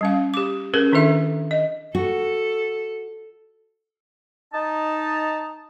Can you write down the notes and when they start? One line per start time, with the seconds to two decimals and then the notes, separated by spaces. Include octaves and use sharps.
0.01 G3 C#4 F5
0.34 G4 D6
0.74 C#4 G#4 A#4 B4
0.92 D#3 D4 E4 A4 E5
1.51 D#5
1.95 F#4 A4
4.53 D#4 A5